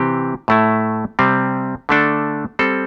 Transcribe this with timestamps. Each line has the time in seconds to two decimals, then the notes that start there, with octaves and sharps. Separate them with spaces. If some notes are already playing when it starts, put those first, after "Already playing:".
Already playing: C3 E3 C4 G4
0.48 A2 A3 E4
1.19 C3 G3 C4
1.89 D3 A3 D4 A4
2.59 G3 C4 A4